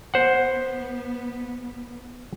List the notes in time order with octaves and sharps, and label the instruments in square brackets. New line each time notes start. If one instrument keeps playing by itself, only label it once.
[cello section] B3 [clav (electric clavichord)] C5 F#5